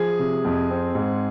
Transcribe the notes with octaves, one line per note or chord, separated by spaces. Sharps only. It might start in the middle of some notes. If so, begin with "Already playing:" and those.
Already playing: F3 G#4
C3
F2
C4
G#2